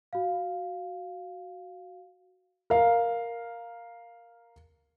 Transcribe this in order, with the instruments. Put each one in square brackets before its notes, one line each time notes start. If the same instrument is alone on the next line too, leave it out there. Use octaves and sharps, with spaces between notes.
[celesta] F#4 F5
[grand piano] A#4 F5